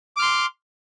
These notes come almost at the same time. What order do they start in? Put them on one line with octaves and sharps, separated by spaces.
D6 F6 C6